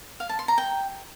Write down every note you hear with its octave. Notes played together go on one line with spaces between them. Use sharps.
F5
A5
C6
A#5
G5